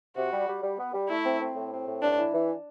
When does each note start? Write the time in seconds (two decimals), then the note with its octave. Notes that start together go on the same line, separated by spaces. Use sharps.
0.16 C3 F#4
0.32 G3
0.47 G3
0.62 G3
0.78 B3
0.93 G3
1.09 A3 E4
1.25 C4
1.40 C4
1.55 A2
1.71 C4
1.87 A2
2.01 G2 D4
2.18 E3
2.33 E3